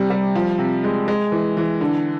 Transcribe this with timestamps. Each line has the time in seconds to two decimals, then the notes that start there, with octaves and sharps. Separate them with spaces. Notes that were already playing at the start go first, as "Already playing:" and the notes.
Already playing: C3 G3
0.10 G3
0.35 F3
0.59 C3
0.84 G#3
1.08 G#3
1.32 E3
1.57 E3
1.81 D3